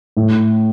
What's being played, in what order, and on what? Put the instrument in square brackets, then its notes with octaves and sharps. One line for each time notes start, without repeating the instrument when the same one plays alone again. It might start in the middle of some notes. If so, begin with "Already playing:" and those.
[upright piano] A2